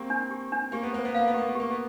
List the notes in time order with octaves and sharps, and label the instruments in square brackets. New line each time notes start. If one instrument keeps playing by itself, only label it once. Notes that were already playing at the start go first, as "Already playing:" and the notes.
Already playing: [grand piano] A#3 C4 [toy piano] G4
[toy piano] D4
G4
D4
[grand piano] A#3 [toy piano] G4
[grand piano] B3
[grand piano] A#3 [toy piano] C5
[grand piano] B3
[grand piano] A#3 [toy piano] F5
[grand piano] B3
[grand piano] A#3 [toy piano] G4
[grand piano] B3
[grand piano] A#3 [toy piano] G4
[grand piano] B3